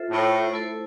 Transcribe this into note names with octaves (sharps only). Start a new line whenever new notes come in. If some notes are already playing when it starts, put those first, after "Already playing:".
Already playing: F4 A4 C5 E5
A2
A3 E4 A4 C5